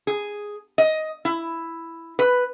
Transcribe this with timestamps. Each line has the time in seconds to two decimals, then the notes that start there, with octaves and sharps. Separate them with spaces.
0.07 G#4
0.78 D#5
1.25 E4
2.19 B4